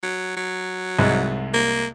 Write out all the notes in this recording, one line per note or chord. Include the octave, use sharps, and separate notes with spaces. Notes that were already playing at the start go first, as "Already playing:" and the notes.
F#3
F#3
C2 G#2 G#3
A#3